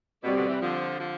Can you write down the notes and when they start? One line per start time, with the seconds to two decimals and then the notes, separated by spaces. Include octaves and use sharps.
0.23 B2 G3 C4 G4 D5
0.35 B2 D3
0.48 C3 E3
0.61 D3 F3
1.00 D3 F3